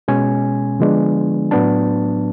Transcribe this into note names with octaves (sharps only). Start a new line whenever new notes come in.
B2 G#3 C#4 G#5
D3 F3 G#3 B3 D4
A2 F#3 B3 D4 A5